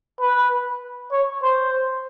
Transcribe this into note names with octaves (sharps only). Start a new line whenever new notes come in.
B4
C#5
C5